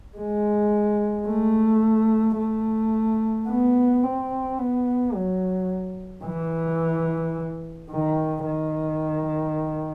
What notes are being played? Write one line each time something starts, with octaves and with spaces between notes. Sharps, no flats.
G#3
A3
A3
B3
C4
B3
F#3
E3
D#3
D#3